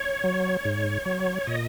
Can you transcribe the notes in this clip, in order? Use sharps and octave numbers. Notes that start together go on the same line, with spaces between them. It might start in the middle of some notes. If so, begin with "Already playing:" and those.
Already playing: C#5
F#3
G#2
F#3
A#2 D#5